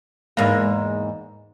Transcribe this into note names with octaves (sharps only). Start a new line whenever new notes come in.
E2 G#2 A#3